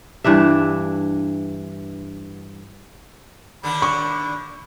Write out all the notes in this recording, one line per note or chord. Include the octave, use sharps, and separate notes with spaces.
G2 E3 D4 E5
D#2 D3 D4 B5
C#6